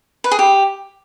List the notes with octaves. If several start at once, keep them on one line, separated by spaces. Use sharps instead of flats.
B4
G#4
G4